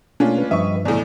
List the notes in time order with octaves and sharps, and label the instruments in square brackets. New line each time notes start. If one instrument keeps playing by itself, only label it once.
[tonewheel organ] B2 A3 A#3 [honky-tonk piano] C#4 D4 F4
[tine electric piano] B4
[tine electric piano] G2 F3 [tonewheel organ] G3 B4 D#5 [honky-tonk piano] E5 C#6
[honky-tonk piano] E2 A2 [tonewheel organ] C3 D5